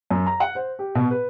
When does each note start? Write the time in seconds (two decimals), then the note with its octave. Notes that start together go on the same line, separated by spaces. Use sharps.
0.11 F#2
0.26 A#5
0.40 F#5
0.55 C5
0.79 G4
0.95 B2
1.11 B4